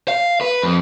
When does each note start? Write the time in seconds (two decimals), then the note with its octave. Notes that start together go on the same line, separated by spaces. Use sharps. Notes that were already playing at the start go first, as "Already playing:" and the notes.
0.08 F5
0.41 B4
0.63 F2